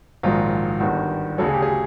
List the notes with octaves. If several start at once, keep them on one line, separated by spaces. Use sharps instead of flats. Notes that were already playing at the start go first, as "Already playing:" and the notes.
A#1 G#2 D#3 F#3 F4
G1 G2 D#3 F#4
D2 C#3 F#3 A4
G#4
G4
G#4